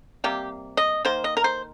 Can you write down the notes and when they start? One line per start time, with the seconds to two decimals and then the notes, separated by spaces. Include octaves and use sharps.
0.24 C3 G3 A#3 G4
0.77 D#5
1.05 D#3 A#3 C5
1.24 D#5
1.37 A#4
1.44 C5